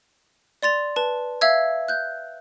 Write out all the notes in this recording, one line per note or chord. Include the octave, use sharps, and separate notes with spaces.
D5 C6 A6 F7
B4 A5
E5 F5 E6 G#6
F#6 G6